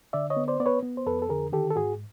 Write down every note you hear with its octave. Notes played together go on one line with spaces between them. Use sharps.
D3 D5 E5
C#5 D#5
B3
C5 D5
B3 D5
B4 C#5
B3
C5
F2 A4 B4
A4
D3 G#4 A#4
D#3 G4 A4
A4
G#2 F#4 G#4